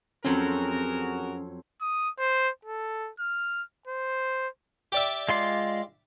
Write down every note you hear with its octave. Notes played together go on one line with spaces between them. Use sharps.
F2 F#3 C4 C#4 F#4 G#4 A#4
D#6
C5
A4
F6
C5
G4 D5 E5
G#3 F4 C6